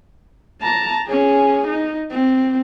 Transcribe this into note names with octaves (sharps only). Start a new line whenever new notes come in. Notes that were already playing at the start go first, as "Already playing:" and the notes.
A5 A#5
C#4 G#4
D#4
C4